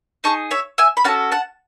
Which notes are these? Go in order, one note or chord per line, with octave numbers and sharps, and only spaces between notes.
D#4 G#4 A5 C#6
C#5 E5
E5 G#5
B5
C#4 F#4 A4 F#5 A5
F#5 A5